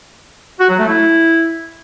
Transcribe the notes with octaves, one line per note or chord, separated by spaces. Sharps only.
F#4
F#3
A3
E4